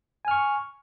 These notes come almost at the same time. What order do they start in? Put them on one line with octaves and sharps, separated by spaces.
G#5 F6 C#6